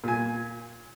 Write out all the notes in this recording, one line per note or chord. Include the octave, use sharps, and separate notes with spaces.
A#2 G#5